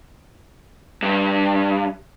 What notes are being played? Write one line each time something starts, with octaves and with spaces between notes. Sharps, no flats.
G2